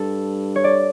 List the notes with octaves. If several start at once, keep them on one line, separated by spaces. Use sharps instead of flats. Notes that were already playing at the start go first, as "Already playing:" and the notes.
Already playing: G2 A4
C#5
D5